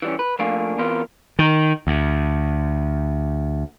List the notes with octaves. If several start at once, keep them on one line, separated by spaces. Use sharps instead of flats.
E3 G3 C#4
B4
F3 A3 A#3 D4 F5 G#5
E3 B3 C4 F4 A#4 B4
D#3
D2